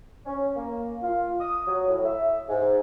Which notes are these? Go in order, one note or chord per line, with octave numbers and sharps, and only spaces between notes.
C#4
A#3
F4
D#6
F#3
A2
E5
G#2